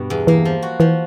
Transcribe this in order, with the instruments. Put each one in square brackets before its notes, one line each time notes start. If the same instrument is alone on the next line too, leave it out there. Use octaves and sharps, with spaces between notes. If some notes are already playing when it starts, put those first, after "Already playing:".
Already playing: [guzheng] G2 B2
E2
[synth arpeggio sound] E3 [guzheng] A#3
[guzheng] F3
F#4
[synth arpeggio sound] E3 [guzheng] F3